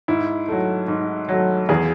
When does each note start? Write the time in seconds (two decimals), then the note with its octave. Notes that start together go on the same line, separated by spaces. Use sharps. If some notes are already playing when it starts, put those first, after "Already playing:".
0.08 G#2 E4
0.48 F#3 A3
0.88 G#2
1.29 F#3 A3
1.69 E2 G#4